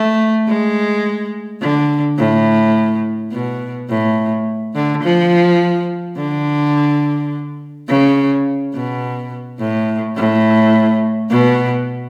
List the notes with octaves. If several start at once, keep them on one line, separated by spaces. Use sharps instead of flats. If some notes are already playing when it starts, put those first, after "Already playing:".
Already playing: A3
G#3
D3
A2
B2
A2
D3
F3
D3
C#3
B2
A2
A2
B2